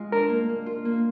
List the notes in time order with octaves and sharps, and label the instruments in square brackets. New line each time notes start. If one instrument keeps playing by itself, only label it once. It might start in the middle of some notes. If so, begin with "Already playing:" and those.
Already playing: [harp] G#3 F4
[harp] D4 [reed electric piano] A#4
[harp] A#3
A#3
F4
A#3